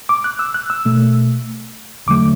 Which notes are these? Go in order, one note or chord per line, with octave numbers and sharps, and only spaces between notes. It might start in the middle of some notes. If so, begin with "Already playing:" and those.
D6
F#6
E6
F#6
E6
B2 A3
E2 D3 F#3 A3 D6